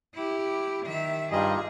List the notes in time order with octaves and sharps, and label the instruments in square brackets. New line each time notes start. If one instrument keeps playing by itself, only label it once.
[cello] E4 G4
D#3 E5
[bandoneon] G2 G3 D#5 [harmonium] D#4 F4 G4 [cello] G#4